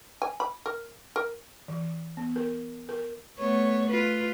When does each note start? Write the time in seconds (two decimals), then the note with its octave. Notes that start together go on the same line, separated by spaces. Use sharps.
0.22 G#5
0.40 B5
0.66 A#4
1.16 A#4
1.68 E3
2.17 B3
2.36 A#4
2.89 A#4
3.38 A3 B3 C#5
3.90 F4 B4